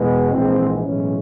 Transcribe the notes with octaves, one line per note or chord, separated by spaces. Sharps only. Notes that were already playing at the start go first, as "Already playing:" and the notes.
Already playing: E2 B2 G#3 B3
A#1 G#2 E3 G#3 C4
B1 A2 E3 G#3 C#4